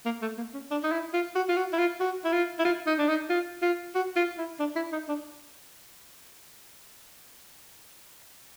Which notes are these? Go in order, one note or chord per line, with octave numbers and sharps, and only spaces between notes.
A#3
A3
A#3
C#4
D4
D#4
E4
F4
F#4
F4
F#4
E4
F4
F#4
E4
F4
E4
F4
D#4
D4
D#4
F4
F4
F#4
F4
E4
D4
E4
D#4
D4